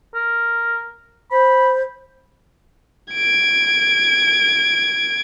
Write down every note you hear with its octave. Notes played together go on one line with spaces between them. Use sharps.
A#4
C5 B5
G#6 D7